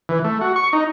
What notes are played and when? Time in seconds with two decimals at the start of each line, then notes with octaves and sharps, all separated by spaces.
0.09 E3
0.24 A3
0.41 F#4
0.56 C#6
0.73 D#4